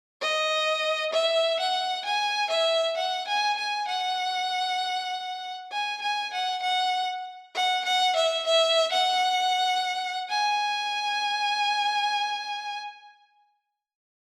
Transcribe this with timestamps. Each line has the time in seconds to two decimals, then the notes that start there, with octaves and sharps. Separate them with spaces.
0.21 D#5
1.13 E5
1.59 F#5
2.05 G#5
2.51 E5
2.97 F#5
3.28 G#5
3.57 G#5
3.88 F#5
5.72 G#5
6.01 G#5
6.33 F#5
6.63 F#5
7.55 F#5
7.85 F#5
8.16 E5
8.46 E5
8.92 F#5
10.30 G#5